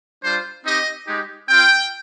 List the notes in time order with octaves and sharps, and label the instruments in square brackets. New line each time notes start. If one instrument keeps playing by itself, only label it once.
[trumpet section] G3 D4 F4 C5
C4 D#4 G4 D#5
G#3 D#4 G4
C4 F4 G5